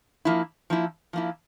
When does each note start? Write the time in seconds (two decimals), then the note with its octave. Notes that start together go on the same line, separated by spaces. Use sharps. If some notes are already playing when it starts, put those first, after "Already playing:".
0.25 F3 A#3 E4
0.70 F3 A#3 E4
1.13 F3 A#3 E4